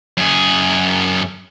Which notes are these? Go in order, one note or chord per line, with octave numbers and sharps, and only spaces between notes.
F#2 G#4